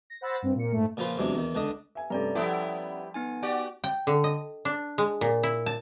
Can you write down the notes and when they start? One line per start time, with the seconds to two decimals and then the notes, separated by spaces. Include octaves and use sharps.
0.10 A#6
0.21 C5 F#5 B5 E6 A6 A#6
0.42 G2 C4
0.55 A#2 C#7
0.72 G#2 A3
0.97 A#2 C#3 F3 F4 B4 C6
1.17 E2 C3 F#3 G#3 C#4 D4
1.35 E2 D#3
1.55 C#2 D3 D4 D#5 D#6
1.95 E5 G#5
2.10 G2 C3 A3 C#4 D5 A#5
2.35 F3 G3 B3 E4 G4 A4
3.14 B3 D#4 G#5
3.43 F#4 G4 D5
3.84 G5
4.07 D3
4.24 D#5
4.65 D4
4.98 G#3
5.21 A#2
5.43 E4
5.66 A5